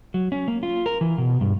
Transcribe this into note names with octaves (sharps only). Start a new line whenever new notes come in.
F#3
C#4
A#3
F4
A#4
E3
B2
G2